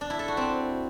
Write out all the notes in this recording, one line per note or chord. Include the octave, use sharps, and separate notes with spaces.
D4
E4
A4
F#4
C4